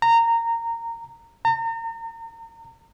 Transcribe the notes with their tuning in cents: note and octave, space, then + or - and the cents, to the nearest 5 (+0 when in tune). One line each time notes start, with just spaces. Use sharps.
A#5 -15
A#5 -40